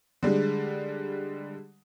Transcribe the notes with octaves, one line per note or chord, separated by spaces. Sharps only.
D3 G3 G#3